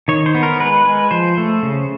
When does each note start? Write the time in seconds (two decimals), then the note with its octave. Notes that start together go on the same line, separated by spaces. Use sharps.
0.08 D#3 C#5
0.26 C5
0.35 B3
0.43 A#4
0.60 G#3 B4
0.85 G#3
1.11 F3 C5
1.37 A3
1.63 C#3